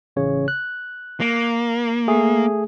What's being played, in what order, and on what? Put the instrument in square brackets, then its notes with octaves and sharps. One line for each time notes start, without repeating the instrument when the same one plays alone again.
[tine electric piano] A1 C#3 C#5
F#6
[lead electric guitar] A#3
[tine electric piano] A3 G#4